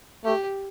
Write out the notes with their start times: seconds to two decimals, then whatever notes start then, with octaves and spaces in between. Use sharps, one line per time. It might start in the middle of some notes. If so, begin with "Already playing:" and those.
0.25 A3 G4